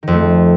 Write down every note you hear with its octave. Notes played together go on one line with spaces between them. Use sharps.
F2 D#3 A3